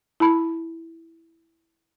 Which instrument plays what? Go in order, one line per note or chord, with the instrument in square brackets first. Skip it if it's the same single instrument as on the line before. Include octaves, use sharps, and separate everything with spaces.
[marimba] E4 A5 B5